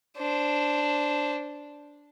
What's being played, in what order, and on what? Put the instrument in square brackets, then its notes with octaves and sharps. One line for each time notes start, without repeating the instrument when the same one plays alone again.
[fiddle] D4 C5